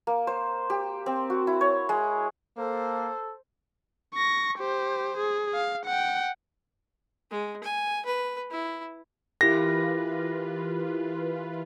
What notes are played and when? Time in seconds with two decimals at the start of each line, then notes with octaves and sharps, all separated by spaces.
0.07 A#3
0.27 C5
0.70 G4
1.06 C4
1.30 F#4
1.47 E4
1.61 C#5
1.89 G#3
2.58 A#3 A4 C5
4.14 C#6 A#6
4.58 G4 C5
5.17 G#4
5.54 F5
5.85 F#5 G5
7.30 G#3
7.63 G#5
8.05 B4
8.50 E4
9.41 E3 E4 F4 G4 A#4 B4 A#6